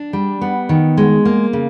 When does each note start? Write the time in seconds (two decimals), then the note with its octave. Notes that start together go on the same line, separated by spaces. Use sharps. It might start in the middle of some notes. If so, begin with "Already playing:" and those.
Already playing: D4
0.13 G3
0.41 B3
0.69 D#3
0.97 G#3
1.25 A#3
1.53 C#3